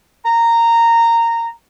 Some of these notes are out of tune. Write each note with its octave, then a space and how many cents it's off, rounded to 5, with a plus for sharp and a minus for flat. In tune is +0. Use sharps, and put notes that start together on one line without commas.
A#5 -15